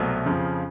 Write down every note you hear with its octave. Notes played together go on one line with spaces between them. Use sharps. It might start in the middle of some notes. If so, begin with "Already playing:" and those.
Already playing: C2 B2 F#3 A3 C4
F2 C#3 F3